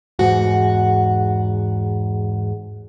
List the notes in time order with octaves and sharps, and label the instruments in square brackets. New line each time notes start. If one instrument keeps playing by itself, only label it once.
[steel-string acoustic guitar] E2 G#2 F#4 F#5